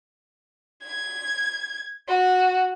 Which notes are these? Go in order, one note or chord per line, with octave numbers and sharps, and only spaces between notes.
G#6
F#4